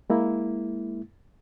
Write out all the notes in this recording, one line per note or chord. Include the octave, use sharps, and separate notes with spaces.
G#3 A#3 E4